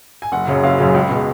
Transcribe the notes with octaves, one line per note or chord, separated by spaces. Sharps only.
G#5
F#1 F#5
F#2 C#3 F#3
F#1 F5
F#2 C#3 F#3
C#2
B2 G#3